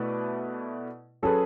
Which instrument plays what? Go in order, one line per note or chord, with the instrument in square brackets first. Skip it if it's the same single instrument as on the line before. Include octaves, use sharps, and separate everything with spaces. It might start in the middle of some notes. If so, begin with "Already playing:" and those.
Already playing: [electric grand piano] B2 A3 E4 B4 D5
[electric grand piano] F#3 C#4 G#4 B4 [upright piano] A4